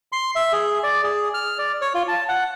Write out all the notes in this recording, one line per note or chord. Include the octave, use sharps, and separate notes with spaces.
C6
E5
G#4
D5
G#4
F6
D5
C#5
F4
A5
F#5